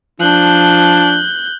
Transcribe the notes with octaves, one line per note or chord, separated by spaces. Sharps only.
F3 D4 F#6 G6